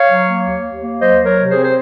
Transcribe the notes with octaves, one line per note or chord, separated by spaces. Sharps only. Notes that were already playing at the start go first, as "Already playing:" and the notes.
Already playing: C#5 F5
F#3
A#3
D#2
D#2
A#3
F#3 C5 D#5
F#3
A#4 C#5
C3
G#4 C5
C4
C5